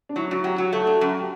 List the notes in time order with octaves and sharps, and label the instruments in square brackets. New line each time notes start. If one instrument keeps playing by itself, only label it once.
[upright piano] D4
[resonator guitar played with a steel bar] F#3 [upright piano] E4
[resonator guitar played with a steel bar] F#2 [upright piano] F#4
[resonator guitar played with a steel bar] F#3 [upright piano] G4
[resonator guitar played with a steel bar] F#3 [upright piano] F#4
[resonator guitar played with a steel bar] A3 [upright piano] F#4
[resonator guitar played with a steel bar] D4
F#2
[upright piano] G4